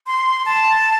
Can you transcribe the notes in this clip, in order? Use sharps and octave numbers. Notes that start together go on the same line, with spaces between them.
C6
A5